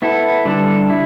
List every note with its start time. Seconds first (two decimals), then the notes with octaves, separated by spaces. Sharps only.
0.02 B3 E4 A4
0.45 D3 G3 D4 A4
0.90 E4